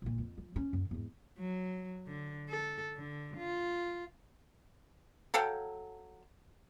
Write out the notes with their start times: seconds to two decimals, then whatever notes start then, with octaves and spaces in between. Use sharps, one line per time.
0.02 A#1 A#2
0.18 F2
0.38 F3
0.56 C#4
0.73 F#2 D#3
0.91 E2 G#2
1.39 F#3
2.08 D3
2.50 A4
2.97 D3
3.37 F4
5.34 F#3 A4 F5 G5